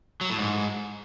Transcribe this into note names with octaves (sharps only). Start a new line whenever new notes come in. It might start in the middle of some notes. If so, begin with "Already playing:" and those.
F#3
A2
G#2